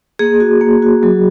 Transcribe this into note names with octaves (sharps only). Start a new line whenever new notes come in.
A#3 G#4
F#4
A#3
F#4
F#3